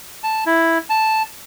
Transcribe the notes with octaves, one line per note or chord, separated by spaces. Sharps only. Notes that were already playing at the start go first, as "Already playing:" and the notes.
A5
E4
A5